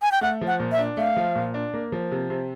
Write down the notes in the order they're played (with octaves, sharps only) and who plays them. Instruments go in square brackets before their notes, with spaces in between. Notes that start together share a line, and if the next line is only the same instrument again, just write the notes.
[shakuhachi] G#5
G5
[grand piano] A3 [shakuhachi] F#5
[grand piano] F3
[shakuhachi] F#5
[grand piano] A#2
[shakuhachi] E5
[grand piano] D4
[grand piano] A3 [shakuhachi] F5
[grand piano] F3
A#2
D4
A#3
F3
C3
C3